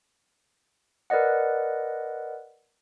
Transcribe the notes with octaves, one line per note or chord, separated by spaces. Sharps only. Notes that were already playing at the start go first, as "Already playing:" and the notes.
A#4 B4 D5 D#5 F#5